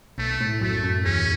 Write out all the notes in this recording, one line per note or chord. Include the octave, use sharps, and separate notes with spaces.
B1 A3
A2
F#2 A3
F#2
E2 C#4